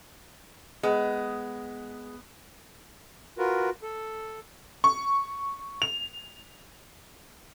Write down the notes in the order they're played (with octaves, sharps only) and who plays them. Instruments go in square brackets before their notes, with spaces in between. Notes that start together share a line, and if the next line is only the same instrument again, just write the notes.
[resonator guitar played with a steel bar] G#3 [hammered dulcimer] B3
[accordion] F4 F#4 A#4 B4
A4
[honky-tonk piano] C#6
F7